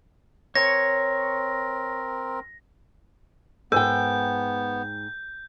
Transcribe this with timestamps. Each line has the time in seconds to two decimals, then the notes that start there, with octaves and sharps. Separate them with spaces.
0.55 C4 A#4 C#5 A#6
3.72 G#2 B3 A#4 G5 G6